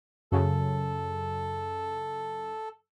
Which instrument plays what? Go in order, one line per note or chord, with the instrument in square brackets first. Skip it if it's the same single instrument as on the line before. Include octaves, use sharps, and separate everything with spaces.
[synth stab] F#2 C#3 [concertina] A4